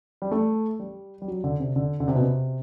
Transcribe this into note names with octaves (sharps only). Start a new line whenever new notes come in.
G3
A3
G3
G3
F#3
D3
C3
D3
D3
C3
B2
C3